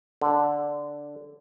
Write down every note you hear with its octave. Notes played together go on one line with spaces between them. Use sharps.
D3